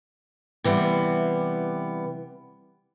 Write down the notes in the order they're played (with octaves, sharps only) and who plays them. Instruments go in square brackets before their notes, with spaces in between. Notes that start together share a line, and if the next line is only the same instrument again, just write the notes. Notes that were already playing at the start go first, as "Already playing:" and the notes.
[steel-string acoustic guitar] C3 E3 G3 B3